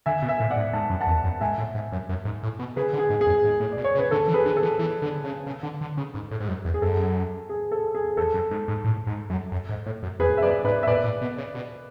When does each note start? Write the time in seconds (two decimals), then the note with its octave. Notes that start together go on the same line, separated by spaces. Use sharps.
0.06 D3 E5 G#5
0.22 B2
0.28 E5 G#5
0.40 A2
0.51 D5 F#5
0.56 G#2
0.73 G#2 A5
0.90 F#2
1.01 F#5 A5
1.07 E2
1.24 F#2
1.41 G#2 E5 G#5
1.58 A2
1.74 G#2
1.92 F#2
2.09 F#2
2.25 G#2
2.43 A2
2.59 B2
2.76 C#3 G#4 B4
2.93 D3
2.99 G#4
3.10 G#2
3.21 G#4
3.26 F#2
3.44 G#2
3.60 A2
3.72 D5
3.77 B2
3.84 C#5
3.95 C#3
3.98 B4
4.11 D3 A4
4.28 E3
4.34 G#4 B4
4.45 D3
4.56 A4
4.63 E3
4.79 E3
5.02 D3
5.24 C#3
5.46 C#3
5.63 D3
5.81 D3
5.97 C#3
6.14 G#2
6.31 A2
6.40 G#2
6.48 F#2
6.65 E2
6.74 G#4
6.82 F#2 A4
7.49 G#4
7.72 A4
7.95 G#4
8.17 E2 A4
8.34 F#2
8.51 G#2
8.68 G#2
8.84 A2
9.07 G#2
9.30 F#2
9.52 F#2
9.69 G#2
9.86 A2
10.03 F#2
10.19 E2 G#4 B4
10.37 E5
10.42 F#2 B4 D5
10.64 G#2 B4 D5
10.83 E5
10.87 A2 B4 D5
11.04 A2
11.21 B2
11.38 C#3
11.54 B2